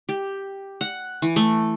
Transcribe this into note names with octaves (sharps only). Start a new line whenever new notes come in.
G4
F#5
E3
A3